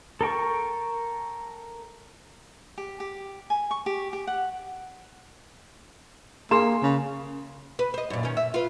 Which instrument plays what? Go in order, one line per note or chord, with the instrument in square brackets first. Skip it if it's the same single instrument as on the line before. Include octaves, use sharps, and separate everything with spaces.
[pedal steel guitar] A4 A#4 G5 C#6
[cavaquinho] G4
G4
G#5
C#6
G4
G4
F#5
[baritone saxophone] A#3 [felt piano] G#4 C6 E7
[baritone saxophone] C#3
[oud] B4
C5 D#5
F#2 A#2
D#3 C#4
E5
F4 B4